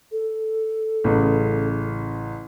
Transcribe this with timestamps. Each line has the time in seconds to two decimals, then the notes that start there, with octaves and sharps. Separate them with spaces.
0.12 A4
1.04 A1 C#3